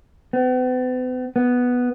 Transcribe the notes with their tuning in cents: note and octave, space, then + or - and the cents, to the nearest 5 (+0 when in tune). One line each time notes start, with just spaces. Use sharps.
B3 +45
B3 +0